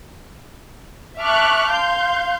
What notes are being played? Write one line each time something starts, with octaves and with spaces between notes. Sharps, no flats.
E5 A5 C#6 D6 F6 F#6
F5 C6 G6